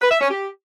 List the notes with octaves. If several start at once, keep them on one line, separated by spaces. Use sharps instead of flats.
B4
E5
C#4
G4